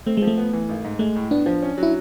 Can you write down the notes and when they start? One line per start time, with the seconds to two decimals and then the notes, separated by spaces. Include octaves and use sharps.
0.06 A3 C4
0.17 F3 G#3
0.27 A3
0.38 B3
0.53 E3
0.69 G#1
0.84 G#2
0.99 G#3 A3
1.16 A2
1.31 B3 D4
1.46 F3
1.62 C#4
1.78 F#3
1.83 E4